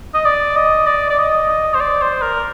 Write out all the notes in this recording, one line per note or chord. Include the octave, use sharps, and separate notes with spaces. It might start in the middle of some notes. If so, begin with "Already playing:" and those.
D#5
D5
D#5
D5
D5
D#5
D#5
C5
D5
C5
A#4